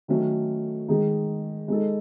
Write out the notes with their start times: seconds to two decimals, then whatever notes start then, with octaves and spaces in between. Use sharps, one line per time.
0.08 D#3 F#3 A3 C#4
0.88 D#3 G#3 D#4 G#4
1.68 G#3 D#4 A4